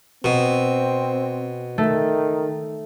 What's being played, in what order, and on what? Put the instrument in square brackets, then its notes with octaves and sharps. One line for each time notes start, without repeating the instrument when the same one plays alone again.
[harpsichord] B2 [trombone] C4
[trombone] D#3 [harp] A3